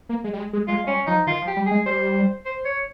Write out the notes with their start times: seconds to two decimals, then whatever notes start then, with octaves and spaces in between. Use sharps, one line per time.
0.09 A#3
0.24 G#3
0.33 G3
0.38 G#3
0.53 G#3
0.68 G#3 F4
0.84 G#3
0.87 G3 C#4
1.07 F3 D#4
1.27 D#3 F4
1.42 F3
1.47 G4
1.56 G3
1.66 G#3 G#4
1.86 G3 C5
2.45 C5
2.65 C#5